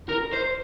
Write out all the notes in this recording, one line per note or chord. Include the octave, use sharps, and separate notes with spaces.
A#4
C5